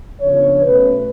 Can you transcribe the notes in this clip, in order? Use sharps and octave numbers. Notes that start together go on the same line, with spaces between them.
C#3 F3 B3 D4 C#5
B2 A3 C#4 B4